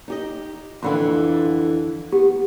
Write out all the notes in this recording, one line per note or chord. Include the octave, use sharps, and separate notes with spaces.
D#4 G4 D#5
F2 D3 E3 G5 B5 C6
B3 G4